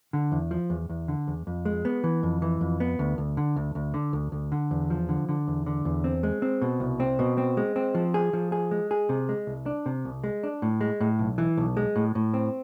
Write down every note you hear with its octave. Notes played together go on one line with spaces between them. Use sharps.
D3
E2
F3
E2
E2
D3
E2
F2
G#3
B3
E3
F2
E3
F2
B3
D2
D2
D3
D2
D2
D3
D2
D2
D3
E2
F3
D3
D3
E2
D3
E2
C4
G#3
C4
B2
C2
C4
B2
C4
G#3
C4
F3
G#4
F3
G#4
G#3
G#4
C3
G#3
C2
D4
C3
C2
G#3
D4
A2
G#3
A2
B1
E3
B1
G#3
A2
A2
C4